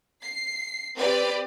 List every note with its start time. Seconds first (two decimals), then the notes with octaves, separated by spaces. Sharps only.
0.22 C7
0.96 C4 G4 B4 D5